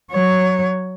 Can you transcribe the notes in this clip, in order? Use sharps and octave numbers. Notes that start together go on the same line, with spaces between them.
F#3 C#5